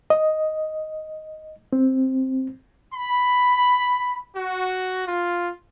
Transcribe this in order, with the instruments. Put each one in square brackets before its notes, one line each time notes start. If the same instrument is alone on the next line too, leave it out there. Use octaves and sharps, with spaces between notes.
[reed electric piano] D#5
C4
[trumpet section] B5
F#4
F4